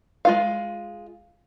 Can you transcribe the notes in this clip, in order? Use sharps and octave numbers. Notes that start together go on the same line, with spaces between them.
G#3 F4 F5